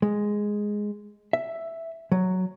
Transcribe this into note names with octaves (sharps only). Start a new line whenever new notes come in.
G#3
E5
F#3